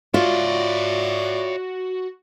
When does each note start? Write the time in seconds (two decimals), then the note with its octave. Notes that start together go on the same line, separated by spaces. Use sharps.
0.14 F4 F#4 C#5 D5 E5